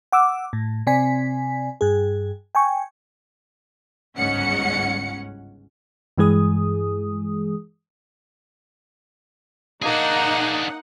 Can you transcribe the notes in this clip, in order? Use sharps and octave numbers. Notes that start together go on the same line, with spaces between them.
F#5 D6 E6
A2
C3 C4 D5 G#5 B6
G2 G#4
G5 G#5 C#6
G1 C#2 G#2 C#4 F#5 C#7
G2 E3 G#3 G#4 D#6
A#3 D4 D#4 G#4 F#5